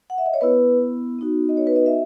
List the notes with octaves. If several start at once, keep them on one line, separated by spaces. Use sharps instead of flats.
F#5
E5
D#5
C#5
B3 E4 B4
B3 D#4 F#4
D#5
C#5
B4
D#5
E5